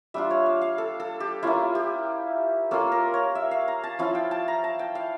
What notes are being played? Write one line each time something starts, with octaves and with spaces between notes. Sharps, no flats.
G3 D4 F4 E5
C#5
F5
F5
A4
A4
G4
A#3 C#4 E4 F4
G4
A#3 C#4 F4 A4
A#4
C#5
E5
F5
A#5
A5
F3 C#4 E4 F5
G5
A5
A#5
A5
G5
F5